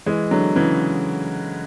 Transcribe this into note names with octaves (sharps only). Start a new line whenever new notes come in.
E3 G#3
D3 F#3
C#3 E3